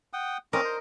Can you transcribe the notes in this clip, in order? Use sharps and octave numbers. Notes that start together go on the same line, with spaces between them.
F#5 G5 D#6
C4 C#4 A#4 D#5 D6
C5